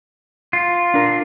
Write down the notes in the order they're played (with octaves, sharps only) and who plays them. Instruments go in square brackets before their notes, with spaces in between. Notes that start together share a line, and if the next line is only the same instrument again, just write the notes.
[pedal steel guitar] F4
[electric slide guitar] D4 A#4